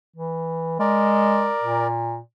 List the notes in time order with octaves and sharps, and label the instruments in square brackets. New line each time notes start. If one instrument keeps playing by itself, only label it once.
[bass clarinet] E3
[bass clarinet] G#3 [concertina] A#4 D5
[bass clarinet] A#2